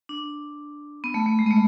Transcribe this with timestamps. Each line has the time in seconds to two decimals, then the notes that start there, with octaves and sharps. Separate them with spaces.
0.09 D4
1.04 B3
1.14 A3
1.26 A3
1.39 G#3
1.46 B3
1.51 A3